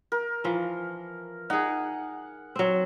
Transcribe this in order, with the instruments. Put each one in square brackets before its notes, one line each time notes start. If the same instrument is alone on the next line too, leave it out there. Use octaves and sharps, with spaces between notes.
[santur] A#4
[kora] E3 F3
[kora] D#4 G#4 [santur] F#5
[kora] F#3 C4